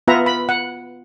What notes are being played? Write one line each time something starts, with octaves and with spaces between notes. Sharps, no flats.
B3 F4 B4 E5 F#5 A#5
B5
F#5